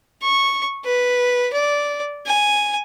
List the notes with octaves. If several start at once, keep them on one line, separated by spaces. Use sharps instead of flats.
C#6
B4
D5
G#5